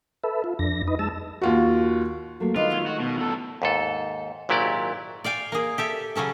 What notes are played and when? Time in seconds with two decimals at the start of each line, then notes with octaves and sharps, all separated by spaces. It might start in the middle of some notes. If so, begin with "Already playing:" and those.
0.24 A4 B4 E5
0.44 F4
0.59 F2 D4 A#6
0.87 D#4 B4 D#5
0.99 G#3 A5 E6
1.42 D#2 F4 F#4
2.40 F#3 A3 A#3
2.56 D#3 G#3 D4 F4 B4 D#5
2.70 F#3 A3 B3
2.86 F#4
3.00 B2
3.17 E2 A4
3.62 D#2 G#2 A4
4.49 G#1 A#2 F#3 E4 G4 D5
5.24 D5 F5 G5 G#5
5.52 A#3 G#4
5.78 G4 A4 E5
6.15 C#3 F#3 C#4 A4